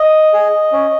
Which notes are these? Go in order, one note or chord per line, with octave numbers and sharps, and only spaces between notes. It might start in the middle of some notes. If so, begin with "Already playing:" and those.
Already playing: D#5
G#4
C#4